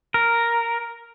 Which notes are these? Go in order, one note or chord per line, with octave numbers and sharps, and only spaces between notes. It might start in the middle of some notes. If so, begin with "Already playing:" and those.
A#4